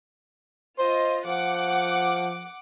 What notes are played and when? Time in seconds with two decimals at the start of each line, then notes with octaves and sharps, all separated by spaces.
0.78 F4 C5 D#5
1.26 F3 F#5 D6